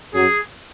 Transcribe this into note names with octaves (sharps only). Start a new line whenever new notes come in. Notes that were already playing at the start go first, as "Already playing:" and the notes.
F#2 F#3 G#4